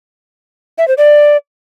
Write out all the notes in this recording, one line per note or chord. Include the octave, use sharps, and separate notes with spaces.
E5
C5
D5